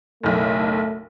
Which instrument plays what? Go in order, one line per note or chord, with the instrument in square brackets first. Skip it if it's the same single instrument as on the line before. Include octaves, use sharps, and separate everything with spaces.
[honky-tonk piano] F#1 B1 [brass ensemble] A3